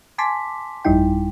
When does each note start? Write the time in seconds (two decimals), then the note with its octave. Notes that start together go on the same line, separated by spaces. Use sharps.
0.18 G#5 A5 C6 D6 B6
0.85 G1 F2 G3 D#4 E4 G5